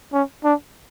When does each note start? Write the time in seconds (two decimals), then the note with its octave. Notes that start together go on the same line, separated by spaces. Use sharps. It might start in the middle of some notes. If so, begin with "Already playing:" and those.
0.13 C#4
0.44 D4